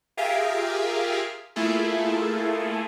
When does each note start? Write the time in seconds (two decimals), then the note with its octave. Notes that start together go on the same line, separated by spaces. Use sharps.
0.17 F4 G4 G#4 A#4 E5 F5
1.56 A3 A#3 E4 F4 G#4 A4